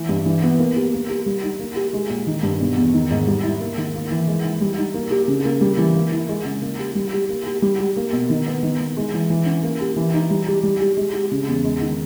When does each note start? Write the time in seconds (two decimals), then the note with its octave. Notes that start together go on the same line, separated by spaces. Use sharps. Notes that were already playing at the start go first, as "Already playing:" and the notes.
Already playing: E3
0.09 G2
0.25 E3
0.42 B3
0.59 A#3
0.76 G4
0.93 A#3
1.09 G4
1.26 G3
1.43 D#4
1.59 A#3
1.76 G4
1.93 G#3
2.09 A#2
2.27 D#3
2.43 G2
2.60 B2
2.77 E2
2.94 D#3
3.11 G#2
3.27 G3
3.43 E4
3.60 A#3
3.78 D#3
3.95 A#3
4.11 E3
4.27 G#3
4.45 E4
4.61 G3
4.77 D#4
4.94 A#3
5.11 G4
5.28 C#3
5.45 A#3
5.61 G3
5.78 E3
5.95 A#3
6.12 E4
6.29 G#3
6.45 C#3
6.61 A#3
6.79 G4
6.95 G3
7.13 G4
7.29 A#3
7.46 G4
7.62 G3
7.79 G4
7.97 A#3
8.13 B2
8.30 D#3
8.47 B3
8.63 D#3
8.80 B3
8.97 G#3
9.13 E3
9.30 E3
9.46 C#4
9.63 A#3
9.80 G4
9.96 E3
10.14 D#4
10.30 G3
10.47 G4
10.63 G3
10.81 G4
10.97 G#3
11.14 G4
11.31 C#3
11.48 E2
11.64 G#3
11.81 D#3